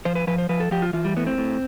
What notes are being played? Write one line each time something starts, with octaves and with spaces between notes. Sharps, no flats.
F3 C5
B4
F3 B4
C5
F3 B4
A4
F3 G4
F4
E3 F4
G3
A2 B3
C4
A2